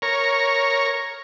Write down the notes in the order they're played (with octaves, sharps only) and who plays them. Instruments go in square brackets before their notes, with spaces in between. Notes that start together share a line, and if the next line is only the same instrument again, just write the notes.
[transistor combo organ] A#4 C#5